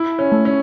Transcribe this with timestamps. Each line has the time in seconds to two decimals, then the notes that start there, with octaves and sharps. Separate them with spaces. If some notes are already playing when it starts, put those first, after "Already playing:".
Already playing: E4
0.19 C#4
0.32 A3
0.45 C#4